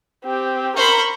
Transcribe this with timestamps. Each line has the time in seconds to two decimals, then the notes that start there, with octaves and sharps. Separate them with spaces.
0.25 C4 G4
0.76 A#4 C5 B5 C#6